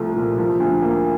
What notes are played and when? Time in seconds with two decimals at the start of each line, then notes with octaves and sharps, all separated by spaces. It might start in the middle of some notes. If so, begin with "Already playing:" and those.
Already playing: C2 F3 A3
0.16 A#2
0.38 F3
0.60 D2
0.82 A#3